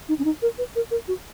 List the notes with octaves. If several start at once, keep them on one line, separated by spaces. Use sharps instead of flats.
D#4
C#4
D#4
A#4
B4
A#4
A#4
F#4